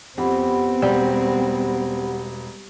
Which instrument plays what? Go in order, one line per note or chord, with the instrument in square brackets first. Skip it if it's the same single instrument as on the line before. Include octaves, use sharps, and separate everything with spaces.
[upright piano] F2 [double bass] B3 C4 [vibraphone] G4 F#5 B5
[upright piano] E1 [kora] G3